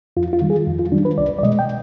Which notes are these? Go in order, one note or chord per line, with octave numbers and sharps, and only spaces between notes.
F2 F4
F4
D#3 G3
G#4
F2
F4
D#3 G3 D4
B4
C2 D5
D5
B2 G#3 D#5
G5